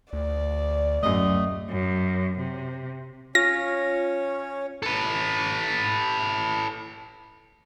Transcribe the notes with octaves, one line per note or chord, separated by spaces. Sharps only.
D2 D5
D1 F#2 A3 D#5
F#2
C3
C#4 F4 C#5 A#6
A4 B4